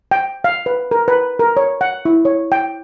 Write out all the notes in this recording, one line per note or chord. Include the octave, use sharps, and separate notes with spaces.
G5
F5
B4
A#4
B4
A#4
C#5
F#5
E4
C#5
G5